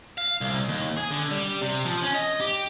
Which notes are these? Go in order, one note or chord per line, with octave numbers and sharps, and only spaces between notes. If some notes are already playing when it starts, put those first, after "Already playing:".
F5
C2
D#2
G#4
D3
G3
C3
F3
C#4
D#5
G4